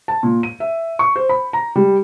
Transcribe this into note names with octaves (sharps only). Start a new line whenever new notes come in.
A5
A#2
D#7
E5
C#6
C5
B5
A#5
G3